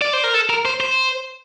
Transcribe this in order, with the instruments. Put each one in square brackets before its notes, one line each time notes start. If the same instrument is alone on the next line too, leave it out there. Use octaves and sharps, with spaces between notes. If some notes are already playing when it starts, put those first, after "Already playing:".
[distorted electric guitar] D5
C5
A#4
A4
A#4
C5
C5